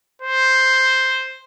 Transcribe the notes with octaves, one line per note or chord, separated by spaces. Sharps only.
C5